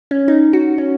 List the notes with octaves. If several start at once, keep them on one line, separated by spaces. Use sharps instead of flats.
C#4
D#4
F#4
C#4